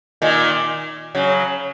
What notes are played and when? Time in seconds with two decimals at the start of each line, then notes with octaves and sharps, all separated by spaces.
0.22 A#2 D#3
1.15 C#3 F#3